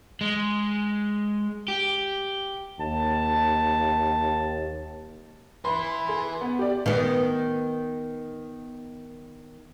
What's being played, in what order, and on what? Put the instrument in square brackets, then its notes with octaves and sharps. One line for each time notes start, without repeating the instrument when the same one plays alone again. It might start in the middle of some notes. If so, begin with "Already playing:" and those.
[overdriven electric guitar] G#3
G4
[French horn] D#2 [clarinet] A5
[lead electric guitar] E4 B4 [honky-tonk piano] B5 C6
[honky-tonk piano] G#4 C6
B3
G4 D5
[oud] D#3 B3